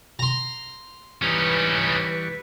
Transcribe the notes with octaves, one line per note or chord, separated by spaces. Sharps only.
A#5 C6
E3 G3 C#4 D#4 B4 C#6